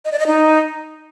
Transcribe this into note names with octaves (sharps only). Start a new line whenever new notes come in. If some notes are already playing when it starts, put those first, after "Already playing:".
D#5
D5
D#5
D#4